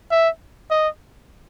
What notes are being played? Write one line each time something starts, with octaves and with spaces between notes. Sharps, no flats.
E5
D#5